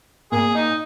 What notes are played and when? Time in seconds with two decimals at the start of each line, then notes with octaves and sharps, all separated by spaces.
0.32 A#2 G#4
0.55 D#4